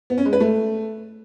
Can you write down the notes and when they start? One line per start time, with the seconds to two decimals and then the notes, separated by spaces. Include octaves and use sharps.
0.10 B3
0.18 C#4
0.25 G#3
0.33 B4
0.40 A3